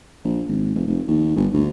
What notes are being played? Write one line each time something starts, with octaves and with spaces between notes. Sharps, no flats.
A#1
G#1
F1
F1
D#2
G1
D2